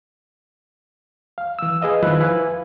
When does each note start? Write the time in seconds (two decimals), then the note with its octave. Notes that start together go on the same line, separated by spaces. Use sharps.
1.38 F5
1.59 E3 E6
1.82 G#4 B4 D#5 F5
2.03 D#3 F3 E4 B4 E6 F#6
2.20 E4 B4 E5 F5 G#5